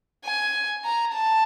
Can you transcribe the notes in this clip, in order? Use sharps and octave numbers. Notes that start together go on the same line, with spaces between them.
G#5
A#5
A5